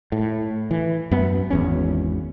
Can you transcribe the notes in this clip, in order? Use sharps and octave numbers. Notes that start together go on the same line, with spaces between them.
A2
E3
F#2 B3
G#1 E2 C#4